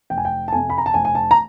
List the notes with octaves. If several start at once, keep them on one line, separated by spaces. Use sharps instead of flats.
F1 G5
G#5
G5
A5
F2 C3 G#5
B5
A#5
A5
F1 G#5
G#5
A5
A#5